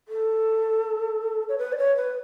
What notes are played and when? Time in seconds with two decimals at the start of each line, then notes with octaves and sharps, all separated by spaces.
0.08 A4
1.49 C#5
1.58 B4
1.73 D5
1.78 C#5
1.97 B4